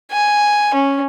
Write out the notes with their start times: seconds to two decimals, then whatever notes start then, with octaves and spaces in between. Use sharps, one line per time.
0.12 G#5
0.74 C#4